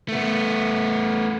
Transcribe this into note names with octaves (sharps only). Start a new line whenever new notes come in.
A3 B3